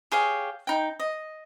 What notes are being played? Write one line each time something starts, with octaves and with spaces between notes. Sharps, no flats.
G4 G#4 C#5 F5
D#4 G5
D#5